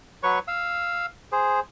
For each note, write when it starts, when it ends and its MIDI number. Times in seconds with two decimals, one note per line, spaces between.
0.23 0.39 54
0.23 0.39 71
0.23 0.39 73
0.23 0.39 85
0.48 1.06 77
0.48 1.06 88
1.32 1.60 68
1.32 1.60 72